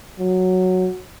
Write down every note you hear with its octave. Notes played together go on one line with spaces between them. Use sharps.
F#3